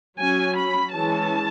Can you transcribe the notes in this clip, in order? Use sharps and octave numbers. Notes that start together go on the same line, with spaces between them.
F#3 C#4 G#5
B5
E3 G#3 C#4 A5